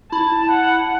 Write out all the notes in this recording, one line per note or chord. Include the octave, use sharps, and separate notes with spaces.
E4 A5
F#5